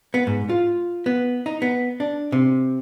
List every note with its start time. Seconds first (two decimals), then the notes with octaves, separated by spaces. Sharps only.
0.14 B3
0.27 G#2
0.50 F4
1.06 B3
1.46 D#4
1.62 B3
2.00 D4
2.32 C3